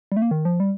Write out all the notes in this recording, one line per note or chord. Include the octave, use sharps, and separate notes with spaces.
G3
A3
A#3
D#3
F3
G3